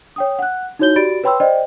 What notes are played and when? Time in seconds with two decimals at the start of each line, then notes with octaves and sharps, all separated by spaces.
0.16 C#5 G5 D#6
0.39 F#5 F#6
0.79 D#4 E4 F#4 C#5 G6 G7
0.96 F#4 G4 D5 B5 A6 D7
1.23 B4 C#5 G5 B5 C6 E6
1.40 C5 D5 D#5 G5